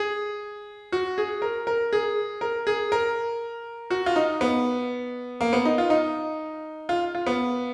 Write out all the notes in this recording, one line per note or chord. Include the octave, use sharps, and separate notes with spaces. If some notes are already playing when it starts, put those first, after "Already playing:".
Already playing: G#4
F#4
G#4
A#4
A#4
G#4
A#4
G#4
A#4
F#4
F4
D#4
B3
A#3
B3
D#4
F4
D#4
F4
F4
B3